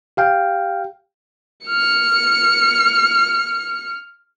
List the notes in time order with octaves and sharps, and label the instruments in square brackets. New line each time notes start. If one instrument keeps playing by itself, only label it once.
[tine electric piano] G4 F5 G5
[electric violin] F6 C#7